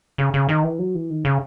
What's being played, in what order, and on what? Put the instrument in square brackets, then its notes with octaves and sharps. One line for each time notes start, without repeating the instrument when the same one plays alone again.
[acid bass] C#3
C#3
D#3
E3
F#3
E3
D#3
C#3